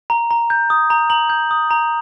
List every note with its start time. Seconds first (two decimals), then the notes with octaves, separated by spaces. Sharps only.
0.10 A#5
0.31 A#5
0.50 G6
0.70 D#6
0.90 A#5
1.10 A#5 F#7
1.30 G6
1.51 D#6
1.71 A#5